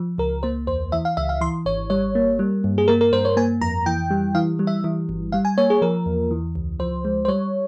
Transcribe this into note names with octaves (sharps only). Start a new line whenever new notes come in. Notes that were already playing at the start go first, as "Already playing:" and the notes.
Already playing: F3
C#2 A#4
A#3 C5
E2 C5
E3 E5
F5
C#2 E5
F5
E3 C6
G#1 C#5
G3 C#5
A#3
G3
G2
G#4
A#3 A#4
A#4
G2 C5
C#5
A#3 G#5
F2 A#5
E3 G5
G3
E3 F5
G3
E5
E3
G1
G3 F5
G#5
A#3 C#5
G#4
F3 A#4
E2
E3
C#2
F3 C5
G#3
C5
G3 C#5